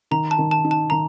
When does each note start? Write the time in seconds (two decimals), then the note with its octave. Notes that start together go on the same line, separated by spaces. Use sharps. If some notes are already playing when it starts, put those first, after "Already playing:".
0.11 D#3 A#5
0.31 A5
0.38 D#3
0.51 A5
0.64 D#4
0.71 A5
0.90 D#3 A#5